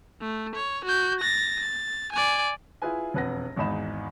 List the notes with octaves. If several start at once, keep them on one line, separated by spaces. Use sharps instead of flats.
A3
C#5
F#4 G6
A6 A#6
A6
D5 G#5
E4 F4 G#4 B4 G#5
E1 F2 B4 F#5 A#6
G#1 E2 G#2 D#4 B5 E7